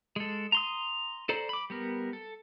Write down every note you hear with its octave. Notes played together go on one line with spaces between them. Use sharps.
G#3 A4
A#5 C6 D#6
A4 C5 D5 A#5
B5 D6
G3 B3 A#4
A4